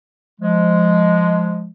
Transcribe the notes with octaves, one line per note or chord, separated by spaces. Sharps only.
F3 G#3